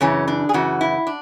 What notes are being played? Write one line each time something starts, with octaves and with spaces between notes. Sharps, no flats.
F#2 C#3 E3 C#4
D4
G#4
F#2 C#3 E3 F#4
E4
D4